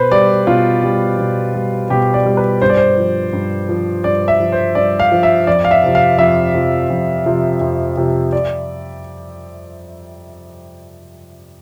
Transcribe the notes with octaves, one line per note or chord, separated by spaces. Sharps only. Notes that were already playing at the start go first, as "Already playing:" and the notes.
Already playing: B2 B4 C5
G3 D5
B2 F4
G3
B2
G3
B2 G4
D5
G3
B4
G2 C5
D5
C5
F3
G2
F3
G2 D5
E5
F3
C5
G2 D5
F5
F3
E5
F2 D5
F5
E5
C3 F3
F5
F2 E5
C3 F3
F2
C3 F3
F2
C3 F3
D5